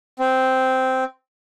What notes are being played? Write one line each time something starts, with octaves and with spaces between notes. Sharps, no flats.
C4